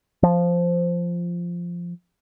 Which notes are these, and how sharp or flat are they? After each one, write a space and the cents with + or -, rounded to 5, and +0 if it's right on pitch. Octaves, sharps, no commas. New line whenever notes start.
F3 -5